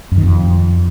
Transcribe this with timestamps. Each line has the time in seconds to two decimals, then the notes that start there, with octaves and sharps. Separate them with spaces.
0.12 F#2
0.17 D#3
0.23 F2